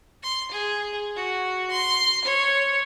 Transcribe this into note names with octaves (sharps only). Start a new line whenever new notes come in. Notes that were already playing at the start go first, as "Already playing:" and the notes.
C6
G#4
F#4
C6
C#5